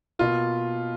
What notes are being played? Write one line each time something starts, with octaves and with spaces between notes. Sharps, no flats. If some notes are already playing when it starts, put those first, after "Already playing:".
B2 A#3 F4